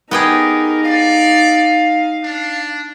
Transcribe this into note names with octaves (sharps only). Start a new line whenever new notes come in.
B3 D#4 G4 G#4 A#4
D5 F5
D4